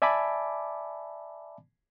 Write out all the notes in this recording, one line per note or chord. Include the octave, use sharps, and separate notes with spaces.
D5 E5 G#5 A5 B5 D6